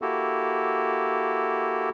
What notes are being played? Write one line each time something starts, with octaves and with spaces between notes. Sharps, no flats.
A#3 E4 F#4 G4 A4